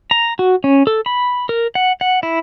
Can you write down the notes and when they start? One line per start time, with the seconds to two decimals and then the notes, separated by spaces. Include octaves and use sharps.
0.11 A#5
0.39 F#4
0.64 C#4
0.87 A4
1.06 B5
1.49 A#4
1.75 F#5
2.01 F#5
2.23 E4